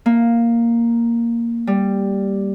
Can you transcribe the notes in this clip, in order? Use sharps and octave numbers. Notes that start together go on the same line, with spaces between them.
A#3
G3